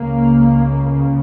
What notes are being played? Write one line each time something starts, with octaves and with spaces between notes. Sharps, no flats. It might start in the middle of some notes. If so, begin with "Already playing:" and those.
Already playing: C#2 C#3 A#3